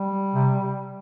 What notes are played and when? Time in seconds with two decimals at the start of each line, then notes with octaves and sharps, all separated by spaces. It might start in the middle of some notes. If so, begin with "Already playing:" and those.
Already playing: G3
0.34 C3